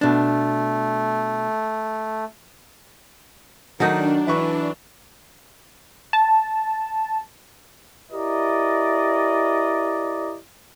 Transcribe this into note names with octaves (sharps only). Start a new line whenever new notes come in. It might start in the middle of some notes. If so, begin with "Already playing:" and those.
B2 A3 D4
D#3 F#3 A3 D4 D#4
E3 E4 B4 C#6
A5
E4 G4 A#4 D5 D#5